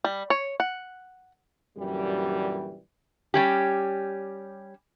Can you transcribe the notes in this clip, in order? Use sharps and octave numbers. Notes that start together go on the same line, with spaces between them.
G3
C#5
F#5
F#2 A#2 D3 E3 G3
G3 C#4 G4